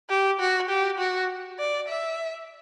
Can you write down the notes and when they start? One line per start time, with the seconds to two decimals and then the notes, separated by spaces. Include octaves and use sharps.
0.10 G4
0.40 F#4
0.69 G4
0.99 F#4
1.59 D5
1.88 E5